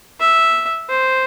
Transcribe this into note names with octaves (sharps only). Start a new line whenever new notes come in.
E5
C5